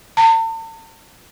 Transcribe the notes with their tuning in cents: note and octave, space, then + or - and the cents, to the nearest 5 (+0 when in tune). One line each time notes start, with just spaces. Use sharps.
A5 +40